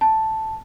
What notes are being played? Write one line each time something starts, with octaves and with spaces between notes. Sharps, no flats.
A5